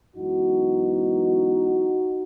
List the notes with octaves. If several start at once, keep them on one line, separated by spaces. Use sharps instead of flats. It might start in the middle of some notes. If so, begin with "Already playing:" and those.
F#2 E3 G#3 B3 D#4 F#4